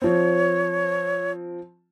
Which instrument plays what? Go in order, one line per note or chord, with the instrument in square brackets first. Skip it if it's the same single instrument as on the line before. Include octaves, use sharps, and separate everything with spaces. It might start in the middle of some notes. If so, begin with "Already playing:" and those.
[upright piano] F3 C4 [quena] C#5